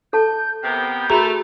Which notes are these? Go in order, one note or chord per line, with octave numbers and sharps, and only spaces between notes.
A4 A5 G6
C3 B3 A#4 G5
A3 F#4 G#4 A#4 A#5 B5 F7